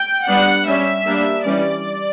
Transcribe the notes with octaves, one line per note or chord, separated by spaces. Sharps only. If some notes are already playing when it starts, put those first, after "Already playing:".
Already playing: G5
G3 B3 D4 F#5
G3 C#4 E5
G3 A#3 D4
E3 G3 C#4 D5